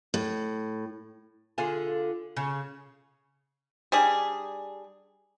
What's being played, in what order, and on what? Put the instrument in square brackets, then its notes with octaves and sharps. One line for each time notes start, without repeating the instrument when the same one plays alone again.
[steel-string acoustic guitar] A2
[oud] D3 F4 G#4
C#3
[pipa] G3 D4 G#4